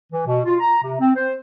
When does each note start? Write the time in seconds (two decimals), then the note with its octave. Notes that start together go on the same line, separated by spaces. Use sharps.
0.12 E3
0.27 B2
0.45 F4
0.60 A#5
0.82 C3
0.99 C4
1.16 C5